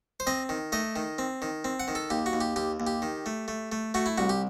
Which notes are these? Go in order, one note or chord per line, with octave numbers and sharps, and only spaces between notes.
C5
C4 D#5
D#3
A3 D#5
D#3
C4
D#3
C4
F#5
D#3
A4
D#2 G4
F#4
D#2
G4
D#2 G4
D#2
G4
D#3
A3
A3
A3
A3 F#4
E4
C2 F#4
G4